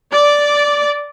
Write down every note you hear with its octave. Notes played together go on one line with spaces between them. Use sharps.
D5